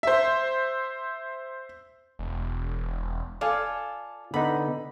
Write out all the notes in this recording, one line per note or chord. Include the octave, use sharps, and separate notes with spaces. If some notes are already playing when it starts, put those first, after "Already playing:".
C5 E5
E1
F4 A4 D5 F5 G#5
D3 B3 D#4 B5